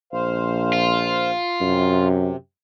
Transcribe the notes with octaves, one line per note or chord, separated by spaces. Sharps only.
A#1 C5 F5
F4
F#2 C3